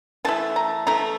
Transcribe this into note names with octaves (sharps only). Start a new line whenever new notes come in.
E3 A3 E4 A5
A#5
E3 A3 E4 A#5